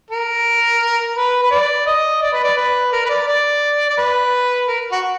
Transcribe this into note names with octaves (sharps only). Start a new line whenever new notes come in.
A#4
B4
B4
D5
D#5
D5
B4
D5
B4
A#4
B4
D5
D5
D5
B4
A#4
F#4